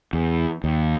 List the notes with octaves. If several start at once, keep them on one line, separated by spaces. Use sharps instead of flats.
E2
D#2